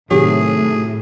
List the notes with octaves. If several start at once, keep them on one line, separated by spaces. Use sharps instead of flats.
A2 C3 D#3 F#3 G4 G#4